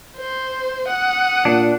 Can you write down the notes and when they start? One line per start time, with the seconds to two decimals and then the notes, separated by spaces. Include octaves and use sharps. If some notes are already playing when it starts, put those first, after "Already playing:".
0.17 C5
0.87 F#5 D#6
1.45 A#2 D4